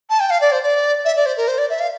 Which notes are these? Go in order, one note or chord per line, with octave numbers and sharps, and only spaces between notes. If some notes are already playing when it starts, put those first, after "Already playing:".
A5
G5
F5
D5
C5
D5
E5
D5
C5
A#4
C5
D5
E5
F5